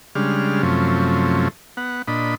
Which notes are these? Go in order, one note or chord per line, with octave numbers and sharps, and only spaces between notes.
C#3 G3 G#3 D4 F6
F#2 C3 F3 A3 C#4
B3 F#5
A#2 D4 D#5 B5